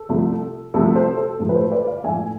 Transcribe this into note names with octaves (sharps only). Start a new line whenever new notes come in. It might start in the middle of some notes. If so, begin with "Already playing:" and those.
Already playing: A4
C2 C3 F3 A3
C2 C3 F3 A3 A4
A4 C5
A4
A1 G#2 F3 A3
B4
A4 C5
B4 D5
D5 F5
A1 G#2 F3 A3 E5 G#5